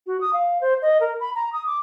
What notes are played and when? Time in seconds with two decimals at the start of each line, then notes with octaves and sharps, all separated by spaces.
0.07 F#4
0.21 D#6
0.33 F5
0.61 C5
0.82 D#5
1.01 A#4
1.20 B5
1.35 A#5
1.53 D#6
1.66 D6